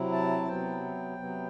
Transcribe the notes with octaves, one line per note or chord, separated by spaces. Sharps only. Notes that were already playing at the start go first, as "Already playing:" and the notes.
Already playing: C3 F#3 C4 E4
A5
C3 F#3 B3 G5
C3 F#3 B3